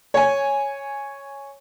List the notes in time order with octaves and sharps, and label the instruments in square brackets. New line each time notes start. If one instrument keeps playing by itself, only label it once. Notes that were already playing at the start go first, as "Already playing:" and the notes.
[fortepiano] C#5 G#5